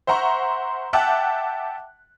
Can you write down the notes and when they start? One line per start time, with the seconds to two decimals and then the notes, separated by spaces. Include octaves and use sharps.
0.07 C5 E5 F#5 A#5 C6 C#6
0.93 E5 F#5 G5 A5 D6 F#6